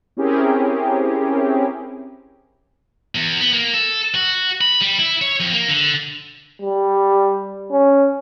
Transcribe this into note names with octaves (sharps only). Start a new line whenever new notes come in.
C4 C#4 E4 G4 G#4 A#4
E2
B3
A#3
A4
F#4
B5
G3
E4
C#5
F2
A#3
D3
G3
C#4